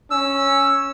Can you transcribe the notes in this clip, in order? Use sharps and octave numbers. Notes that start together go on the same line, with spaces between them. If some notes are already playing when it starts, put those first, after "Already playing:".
C#4 E6